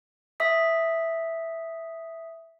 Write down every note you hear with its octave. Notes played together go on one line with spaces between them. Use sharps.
E5 D#6 B6